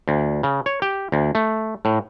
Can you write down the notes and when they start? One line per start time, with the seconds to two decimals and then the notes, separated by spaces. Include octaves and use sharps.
0.08 D2
0.43 C#3
0.66 C#5
0.82 G4
1.12 D2
1.35 A3
1.85 A2